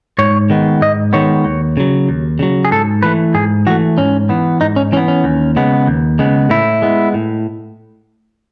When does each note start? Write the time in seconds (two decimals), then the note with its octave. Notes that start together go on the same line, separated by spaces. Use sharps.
0.19 G#2 C#5
0.50 D#3 G#3 B3
0.81 G#2 D#5
1.13 D#3 G#3 B3 C#5
1.45 D#2
1.77 C#3 F#3
2.09 D#2
2.39 C#3 F#3
2.65 G#4
2.71 G#2 A4
3.03 E3 A3 B4
3.34 G#2 G#4
3.66 E3 A3 F#4
3.98 G#2 C#4
4.29 E3 B3
4.61 G#2 D#4
4.76 C#4
4.92 E3 C#4
4.97 B3
5.08 C#4
5.24 D#2
5.56 C#3 G#3 B3
5.87 D#2
6.19 C#3 G#3 B3
6.50 A2 E4
6.82 G#3 B3
7.14 A2